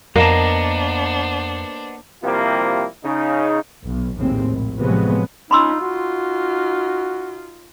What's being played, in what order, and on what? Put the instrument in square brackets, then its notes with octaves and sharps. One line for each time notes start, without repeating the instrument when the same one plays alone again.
[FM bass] F2 [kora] A#3 [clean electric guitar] B3 D#5 A5 [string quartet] D4 C5
[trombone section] C3 F3 G3 A#3 E4 F4
C#3 D#4
[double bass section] B1
A#1 D#2 A2 C3 G#3 C4
A#1
A2 C3 F3 F#3 G#3 B3
[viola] C#4 F4 [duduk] D#4 [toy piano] B5 C6 E6
[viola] D#4 F4 [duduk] F#4